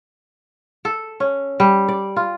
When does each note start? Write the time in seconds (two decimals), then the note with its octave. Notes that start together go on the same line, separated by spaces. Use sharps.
0.85 A4
1.20 C#4
1.60 G3
1.88 D5
2.16 F4